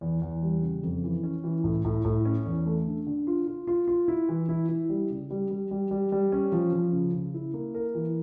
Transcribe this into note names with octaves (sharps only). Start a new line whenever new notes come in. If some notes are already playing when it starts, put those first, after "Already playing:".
E2
E2
G3
C#3
F2
E3
C#4
E3
A2
A2
A2
C#4
E2
A3
D3
D3
F4
F4
F4
F4
E4
E3
E4
E4
G3
C#3
G3
G3
G3
G3
G3
C#4
F3
F3
C#3
C#3
E4
A#3
A#4
E3